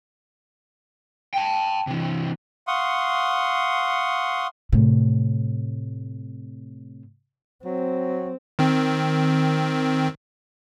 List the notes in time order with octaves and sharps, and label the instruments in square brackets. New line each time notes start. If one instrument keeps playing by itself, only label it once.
[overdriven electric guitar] G5 A5
C3 E3
[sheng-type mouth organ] F5 F#5 C6 C#6 D#6
[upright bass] A2 C3
[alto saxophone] F#3 [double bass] C4
[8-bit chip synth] D#3 C4